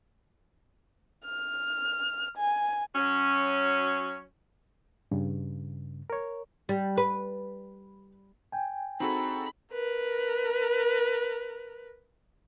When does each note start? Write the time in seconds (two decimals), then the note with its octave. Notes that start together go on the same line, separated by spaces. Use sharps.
1.25 F6
2.37 G#5
2.95 F#3 C#4
5.11 G2 C#3
6.10 A#4 C#5
6.69 G3
6.97 B4
8.52 G5 G#5
9.00 C4 D#4 F#4 G#4 A4 B5
9.73 A#4 B4